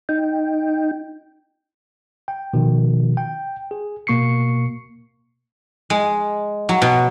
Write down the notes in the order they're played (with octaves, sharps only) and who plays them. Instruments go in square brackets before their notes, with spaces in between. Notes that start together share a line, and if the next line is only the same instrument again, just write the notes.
[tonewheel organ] D#4 G5
[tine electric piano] G5
B2 D#3 F3
G5
G#4
B2 A#3 C#6 C7 C#7
[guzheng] G#3
F#3
B2